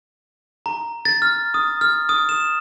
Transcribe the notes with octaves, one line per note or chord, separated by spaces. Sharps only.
A#5
A6
F6
D#6
F6
D#6
E7